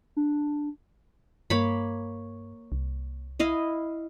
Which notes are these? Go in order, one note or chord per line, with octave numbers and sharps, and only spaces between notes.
D4
G2 A#3 C#5 B5
C2
E4 D#5 F5